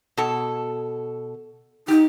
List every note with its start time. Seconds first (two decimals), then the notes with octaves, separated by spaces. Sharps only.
0.17 B2 A4
1.88 D#4 G4